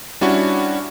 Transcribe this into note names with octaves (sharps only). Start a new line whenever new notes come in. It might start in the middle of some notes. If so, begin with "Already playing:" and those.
G3 C#4 D4 E4 F#4